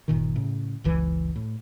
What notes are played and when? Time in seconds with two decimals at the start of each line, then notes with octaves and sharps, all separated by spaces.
0.08 F#1 A#2 D#3
0.36 A2 C#3
0.84 F#1 C#2 E3
1.36 A2